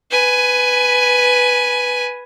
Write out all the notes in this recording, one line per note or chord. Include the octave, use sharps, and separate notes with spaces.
B4 G#5